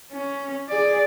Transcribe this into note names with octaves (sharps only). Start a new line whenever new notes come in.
C#4
G#4 D5